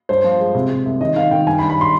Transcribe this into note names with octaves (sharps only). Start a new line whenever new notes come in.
G2 C5
F3
G#3
C3
C3
C2
D#3 D#5
D#3 F5
D#3 G5
G2 G#5
B5
G2
B5
C6